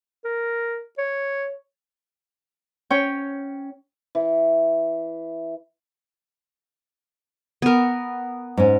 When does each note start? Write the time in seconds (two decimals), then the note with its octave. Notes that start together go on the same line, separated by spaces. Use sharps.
0.25 A#4
0.98 C#5
2.90 C#4 C#5 G5
4.15 E3
7.62 B3 A#4
8.57 G#2 C#4